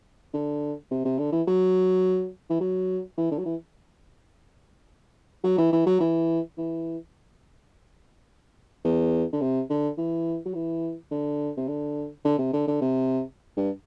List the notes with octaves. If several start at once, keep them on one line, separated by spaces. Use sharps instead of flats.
D3
C3
C3
D3
E3
F#3
E3
F#3
E3
D3
F#3
E3
F#3
E3
E3
F#3
E3
E3
E2
D3
C3
D3
E3
F#3
E3
D3
C3
D3
D3
C3
D3
D3
C3
G2